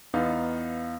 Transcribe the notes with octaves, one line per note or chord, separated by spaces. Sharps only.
E2 B3 D#4 F5